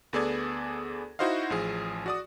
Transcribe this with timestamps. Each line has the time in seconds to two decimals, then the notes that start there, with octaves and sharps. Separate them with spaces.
0.13 D2 B3 G#4 A4 D5 G#6
1.19 D#4 E4 F#4 C5 D#5 F5
1.50 A1 F3 G#4
2.06 F#4 D5 D#6